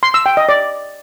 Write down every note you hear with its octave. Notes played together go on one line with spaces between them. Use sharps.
C6
E6
G5
D#5
D5